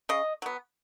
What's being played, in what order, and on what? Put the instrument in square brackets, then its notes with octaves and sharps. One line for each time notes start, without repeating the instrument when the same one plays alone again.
[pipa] C#3 D#5
F#3 B3